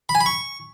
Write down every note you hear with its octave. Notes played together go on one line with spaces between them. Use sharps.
B5
G#5
B5
C#6